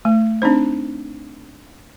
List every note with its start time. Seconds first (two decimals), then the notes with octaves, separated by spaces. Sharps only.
0.05 A3
0.42 C4 D4 D#4 C5